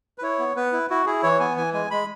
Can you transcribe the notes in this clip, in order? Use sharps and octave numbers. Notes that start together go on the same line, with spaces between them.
B4
E4 C#5
B3
B3 B4
E4
E4 F#4
E4 G#4
E3 C#5
B3 G#5
E3 G#5
G#3 G#5
G#3 B5